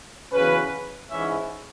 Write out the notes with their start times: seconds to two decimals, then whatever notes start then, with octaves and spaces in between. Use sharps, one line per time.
0.33 E2 C#3 F#3 C#4 B4
1.09 G#2 E3 C#4 E5